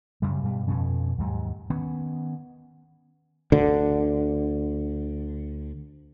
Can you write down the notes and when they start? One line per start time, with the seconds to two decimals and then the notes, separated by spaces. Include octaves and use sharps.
0.22 F#2 C#3 G3
0.43 G2 B2 G3
0.68 F2 B2 F3 C#4
1.18 D#2 G#2 F#3
1.70 D#3 B3 C#4
3.52 D2 D3